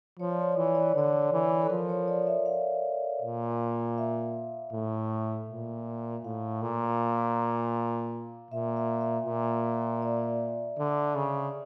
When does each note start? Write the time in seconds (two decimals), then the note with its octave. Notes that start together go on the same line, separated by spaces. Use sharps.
0.19 F3 C#5
0.30 D5
0.41 C#5
0.52 E3 D5
0.64 C#5
0.75 D5
0.87 C#5
0.95 D3 D5
1.08 C#5
1.33 E3
1.62 A4
1.70 F3 A#4
1.89 C#5
2.08 D5
2.27 E5
2.46 F5
3.22 A#2
3.98 E5
4.72 A2
5.49 A#2
6.24 A2 F5
6.62 A#2
8.51 A#2 E5
8.77 E5
9.01 E5
9.26 A#2
10.02 D5
10.78 D3
11.15 C#3